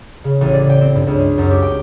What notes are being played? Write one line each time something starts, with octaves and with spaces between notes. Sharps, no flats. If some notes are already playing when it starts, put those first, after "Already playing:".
C#3
A1
D5
G5
C4
G2
C#2
G#3
F#2
G4
G5